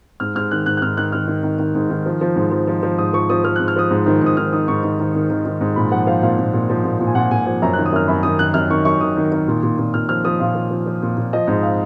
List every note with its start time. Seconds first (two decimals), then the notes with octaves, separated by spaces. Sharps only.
0.20 G#2 F6
0.35 G#2 F6
0.51 D#3 F#6
0.66 G#2 F#6
0.77 F#6
0.82 G#2 F6
0.97 D#3 F#6
1.12 D#3 F6
1.28 D#3
1.43 D#3
1.59 D#3
1.75 G#2
1.90 D#3
2.06 F3
2.21 F3
2.36 G#2
2.51 F3
2.67 F3
2.83 F3
2.98 G#2 D#6
3.13 F3 C#6
3.30 F3 D#6
3.44 F3 F6
3.56 G#2 F#6
3.68 F6
3.76 F3 D#6
3.90 G#2
4.06 D#3
4.22 G#2 D#6
4.37 D#3 F6
4.53 D#3 D#6
4.68 G#2 C#6
4.83 D#3
4.99 D#3
5.15 D#3
5.30 D#3
5.46 D#3
5.61 G#2
5.76 A#2 B5
5.91 F3 F#5
6.07 F3 F5
6.23 A#2 F5
6.39 A#2
6.54 A#2
6.70 F3
6.84 A#2
7.00 A#2
7.07 G#5
7.15 A#2 F#5
7.31 A#2 G#5
7.46 F3 G#5
7.62 F#2 A#5
7.73 D#3 F#6
7.86 D#6
7.92 F#2 F6
8.08 F#2 B5
8.23 D#3 D#6
8.39 D#3 F#6
8.54 F#2 F6
8.70 D#3 C#6
8.85 F#2 C#6
9.01 D#3 D#6
9.17 D#3
9.32 D#3
9.48 A#2
9.63 A#2
9.78 A#2
9.94 A#2 F6
10.09 F3 F6
10.25 F3 D#6
10.40 A#2 F5
10.55 F3
10.71 F3
10.86 F3
11.02 A#2
11.17 A#2
11.33 F3 D#5
11.47 G#2 D#5
11.63 F5